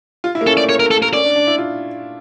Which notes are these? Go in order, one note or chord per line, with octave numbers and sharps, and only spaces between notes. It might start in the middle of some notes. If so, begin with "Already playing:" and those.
F4
E4
A#3
C#4 A4
A3 D5
A#3 C#5
A#4
A3
A4
A#3
A#4
C#4 D5
D4
D4
E4
F4